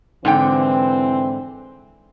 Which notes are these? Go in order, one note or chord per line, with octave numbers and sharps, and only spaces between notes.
G#2 D3 E3 C4 G5